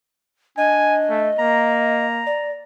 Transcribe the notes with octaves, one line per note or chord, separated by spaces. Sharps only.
D4 D#5 G#5
A3
A#3 A#5
D5